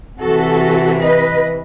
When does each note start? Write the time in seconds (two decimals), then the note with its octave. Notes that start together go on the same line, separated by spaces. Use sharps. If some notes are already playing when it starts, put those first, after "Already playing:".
0.20 C3 E3 F#4 A4
1.01 B4 D#5